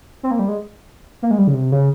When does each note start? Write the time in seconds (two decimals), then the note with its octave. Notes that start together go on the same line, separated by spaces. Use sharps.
0.23 C4
0.31 A#3
0.39 G3
0.48 G#3
1.22 A#3
1.31 G#3
1.38 G3
1.47 C#3
1.54 C3
1.72 C#3